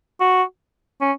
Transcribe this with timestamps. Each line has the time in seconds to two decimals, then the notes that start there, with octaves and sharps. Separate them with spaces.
0.21 F#4
1.01 C#4